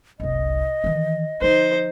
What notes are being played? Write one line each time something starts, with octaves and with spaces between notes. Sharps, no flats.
F#1 C2 D#5
D#3 E3
D3 F3 D#4 C5